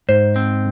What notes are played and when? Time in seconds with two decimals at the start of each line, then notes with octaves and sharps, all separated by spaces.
0.09 G#2 C5
0.36 C4